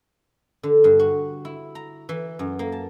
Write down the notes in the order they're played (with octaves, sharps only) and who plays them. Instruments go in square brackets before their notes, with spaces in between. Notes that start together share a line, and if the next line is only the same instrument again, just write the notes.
[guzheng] D3
G2
F#4
E4
A#5
E3
F#2
A#3
A5